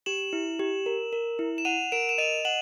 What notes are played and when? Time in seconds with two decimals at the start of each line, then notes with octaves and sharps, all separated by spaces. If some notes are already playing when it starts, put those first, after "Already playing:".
0.06 G4 E7 F#7
0.33 E4
0.59 G4
0.86 A#4
1.13 A#4
1.39 E4
1.58 E7
1.65 F#5 D#7 F7
1.92 A#4 D7 E7
2.09 E7
2.18 D#5 D#7 F7
2.45 F#5 E7 F#7